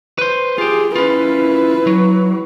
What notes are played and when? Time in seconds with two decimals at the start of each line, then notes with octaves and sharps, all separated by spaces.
0.18 B4 C5
0.58 F4 G4 G#4
0.96 C#4 E4 F4 B4
1.87 F#3